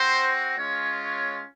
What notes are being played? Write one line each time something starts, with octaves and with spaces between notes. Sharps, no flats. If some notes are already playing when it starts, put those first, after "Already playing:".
Already playing: C4 F#4 C5
G#3 C#4 F4 C#5
C#5